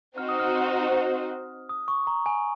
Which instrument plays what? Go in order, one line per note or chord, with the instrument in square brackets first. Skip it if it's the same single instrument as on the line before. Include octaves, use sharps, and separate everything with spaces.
[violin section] C4 D#4 F#4 C5 [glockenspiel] F6
[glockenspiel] D#6
F6
D#6
C#6
A#5
G#5